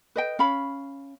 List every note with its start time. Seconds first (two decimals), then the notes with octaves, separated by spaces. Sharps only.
0.16 B4 D#5 G5
0.39 C#4 F5 B5